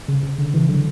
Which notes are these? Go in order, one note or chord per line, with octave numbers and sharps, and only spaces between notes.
C#3
C#3
D3
C#3 E3
D3 F#3